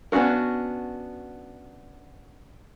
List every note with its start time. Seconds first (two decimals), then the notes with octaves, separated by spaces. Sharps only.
0.12 B3 C#4 D4 F#4 A#4